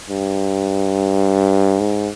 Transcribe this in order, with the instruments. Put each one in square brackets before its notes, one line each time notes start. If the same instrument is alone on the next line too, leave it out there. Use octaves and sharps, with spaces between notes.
[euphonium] G2
G#2